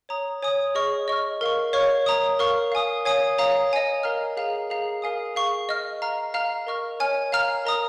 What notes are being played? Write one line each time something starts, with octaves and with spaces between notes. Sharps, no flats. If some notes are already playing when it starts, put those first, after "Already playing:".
C#5 A#5 D#6
C#5 G#5 D#6
G#4 D#5 C#6 F6
D#5 C#6 F6
A#4 F5 C#6
C#5 F5 C#6 F6
C#5 A#5 D#6
A#4 F5 C#6 F6
F5 G#5 D#6
C#5 F5 G#5 D#6
C#5 F5 A#5 D#6
D#5 G#5 D#6
A#4 F5 A#5 F6
G#4 F5 A#5
G#4 F5 A#5
A#4 F5 G#5 D#6
G#4 F5 C#6
D#5 C#6 F6
F5 A#5 F6
F5 A#5 F6
A#4 D#5 C#6 F6
C#5 G#5 F6
F5 A#5 F6
A#4 D#5 A#5 D#6